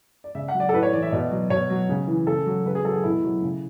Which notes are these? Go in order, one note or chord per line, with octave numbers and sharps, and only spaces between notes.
D5
C#3 E5
F#5
F#3
D5
A4
A2 B4
C#5
E3 D5
E5
B2 D5
F#3
B2 C#5
F#3
C#3
E3
C#3 A4
F#3
C#3 B4
G#4
F#3 A4
G#4
B2 E4
F#3
C#3